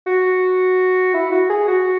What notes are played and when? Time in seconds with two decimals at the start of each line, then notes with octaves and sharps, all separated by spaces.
0.06 F#4
1.14 E4
1.32 F#4
1.50 G#4
1.68 F#4